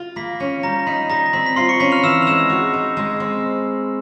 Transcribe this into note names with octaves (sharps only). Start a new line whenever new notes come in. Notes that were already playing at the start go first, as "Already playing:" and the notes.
Already playing: F4
A#3 B5 B6
C#4
G3 A#5 A#6
D#4 B5 B6
G3 A#5 A#6
C4 B5 B6
B6
F4 C6 C7
C#6 C#7
C#4 B5 B6
F6 F7
E3 E6 E7
F7
G#3 E6 E7
F#4
D#4
G#3
C4